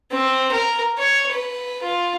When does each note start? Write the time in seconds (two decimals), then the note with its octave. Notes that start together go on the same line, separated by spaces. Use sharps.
0.11 C4
0.52 A#4
0.98 C#5
1.32 B4
1.83 F4